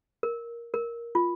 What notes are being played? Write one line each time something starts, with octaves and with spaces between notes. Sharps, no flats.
A#4
A#4
F4